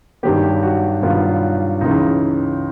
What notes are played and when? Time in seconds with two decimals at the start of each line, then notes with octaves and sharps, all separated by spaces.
0.23 G2 D#3 F#3 B3 G4
0.63 F#4
1.02 G2 D#3 F#3 B3 F4
1.81 C#2 C#3 E3 D#4